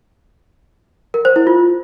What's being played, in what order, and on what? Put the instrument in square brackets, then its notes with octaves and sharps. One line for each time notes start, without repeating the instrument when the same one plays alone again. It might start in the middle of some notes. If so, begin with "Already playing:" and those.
[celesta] A#4
C5
E4
F4